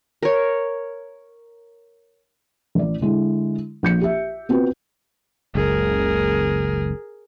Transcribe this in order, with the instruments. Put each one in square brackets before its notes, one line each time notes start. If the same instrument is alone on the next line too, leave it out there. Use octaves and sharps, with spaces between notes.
[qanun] A#4 C#5
[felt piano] A1 D5
D3 G#3 E4
A#1 G6 C#7
G4 E5
B3 C4 F4 F#4 B4
[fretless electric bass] F#1 C#2 [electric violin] G#4 A#4